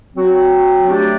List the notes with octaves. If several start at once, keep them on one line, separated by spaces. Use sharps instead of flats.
F#3 C4 F#4
F#3 A3 D4 G4 D5